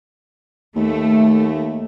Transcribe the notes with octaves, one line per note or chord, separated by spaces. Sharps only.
D#2 A3